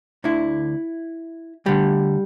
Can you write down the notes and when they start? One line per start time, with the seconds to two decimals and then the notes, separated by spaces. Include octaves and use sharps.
0.24 D2 D3 E4
1.66 D2 D3 G3